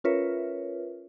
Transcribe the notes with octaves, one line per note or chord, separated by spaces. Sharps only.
C#4 F4 A#4 B4 C#5 E5